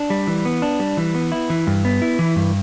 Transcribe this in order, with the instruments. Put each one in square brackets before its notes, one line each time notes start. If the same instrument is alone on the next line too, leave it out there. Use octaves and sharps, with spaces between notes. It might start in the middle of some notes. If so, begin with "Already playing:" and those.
Already playing: [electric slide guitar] D4
G3
E3
B3
D4
G3
E3
B3
E4
E3
G2
B3
E4
E3
G2